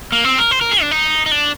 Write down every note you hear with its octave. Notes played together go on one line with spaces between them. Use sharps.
A#3
C4
A#4
C5
A#4
G#4
D4
D#4
D#4
D4